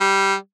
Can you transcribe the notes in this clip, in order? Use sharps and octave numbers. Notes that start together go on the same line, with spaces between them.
G3